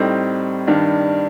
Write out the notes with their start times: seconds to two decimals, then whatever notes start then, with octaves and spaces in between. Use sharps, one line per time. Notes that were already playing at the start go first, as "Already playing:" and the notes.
Already playing: A2 G3 C4 D#4
0.67 G2 D#3 G3 D4